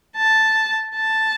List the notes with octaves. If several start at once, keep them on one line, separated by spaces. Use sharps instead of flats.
A5
A5